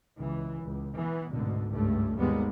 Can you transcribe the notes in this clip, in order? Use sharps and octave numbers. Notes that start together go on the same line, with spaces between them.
C#2 E3
C#2
E3 B3
G#1 D2 B2 D3
C#2 G2 A3
G#1 D#2 G3 G#3 A#3 B3